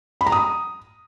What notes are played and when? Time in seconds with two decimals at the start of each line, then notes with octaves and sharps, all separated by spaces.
0.21 B5
0.26 A#5
0.32 D#6